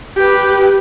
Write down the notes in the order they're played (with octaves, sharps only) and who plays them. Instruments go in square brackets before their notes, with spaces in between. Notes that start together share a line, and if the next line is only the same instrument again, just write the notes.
[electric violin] G4 B4